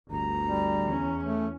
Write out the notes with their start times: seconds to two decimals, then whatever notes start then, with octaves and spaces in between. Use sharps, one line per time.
0.11 G1 D2 A#5
0.47 G3
0.86 E2 C#4
1.24 A3